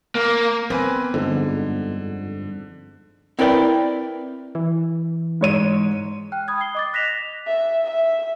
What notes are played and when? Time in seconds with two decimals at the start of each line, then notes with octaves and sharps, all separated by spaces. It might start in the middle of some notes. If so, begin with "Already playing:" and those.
0.15 A#3
0.70 B3 C4 B4 G#5
1.14 G1 F2 G#2 D3
3.39 C4 E4 A#4 B4 D5 G5
4.55 E3
5.41 G#2 C#5 D#7
6.32 G5 F6 F#6
6.48 B5 D#6 G#6
6.61 C7 G7
6.75 D#5 D6 A6
6.93 F#6 A#6 B6 E7 F7
7.47 E5
7.85 E5